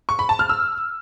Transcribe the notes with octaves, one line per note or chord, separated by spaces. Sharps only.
C#6
B5
A5
F6
E6